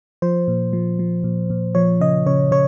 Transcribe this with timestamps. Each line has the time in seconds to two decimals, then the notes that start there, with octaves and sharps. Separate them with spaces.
0.22 F3 C5
0.48 A#2
0.73 F3
0.99 F3
1.24 A#2
1.50 A#2
1.75 F3 C#5
2.01 C#3 D#5
2.26 C#3 C#5
2.51 C#3 C#5